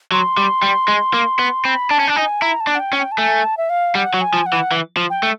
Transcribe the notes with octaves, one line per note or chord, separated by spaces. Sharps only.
F#3 C6
G3
G3
G#3
A#3
B3
C4 B5
D4 A5
C#4
D4 A5
D#4 G#5
E4 A#5
A5
D4
F#5
G5
C#4
G5
A5
A3 G#5
A5
E5
F5
G3 F#5
F#3
G#5
F3
F#5
E3
E3
F3
G5
A3